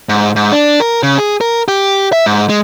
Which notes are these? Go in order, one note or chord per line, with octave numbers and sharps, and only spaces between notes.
G#2
G#2
D4
A#4
C#3
G#4
A#4
G4
E5
G#2
G#3